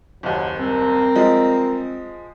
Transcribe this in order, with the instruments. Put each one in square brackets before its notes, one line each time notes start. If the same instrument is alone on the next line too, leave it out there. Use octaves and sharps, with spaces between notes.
[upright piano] F#1 D#2 [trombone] F#3
[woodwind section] G3 C4 [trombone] A#4
[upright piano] F3 G#3